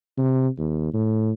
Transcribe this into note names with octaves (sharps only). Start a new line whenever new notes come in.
C3
D#2
A2